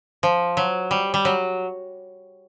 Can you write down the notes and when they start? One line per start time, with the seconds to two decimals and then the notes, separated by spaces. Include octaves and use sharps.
0.23 F3
0.57 F#3
0.91 G3
1.14 G3
1.25 F#3